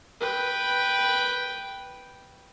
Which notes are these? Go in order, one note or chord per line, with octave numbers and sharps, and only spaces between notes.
B4 G5